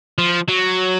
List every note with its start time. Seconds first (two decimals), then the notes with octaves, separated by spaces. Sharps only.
0.18 F3
0.49 F#3